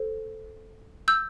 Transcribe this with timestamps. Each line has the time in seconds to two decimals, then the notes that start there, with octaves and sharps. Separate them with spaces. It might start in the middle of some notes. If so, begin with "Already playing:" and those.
Already playing: A4 C5
1.08 E6 G6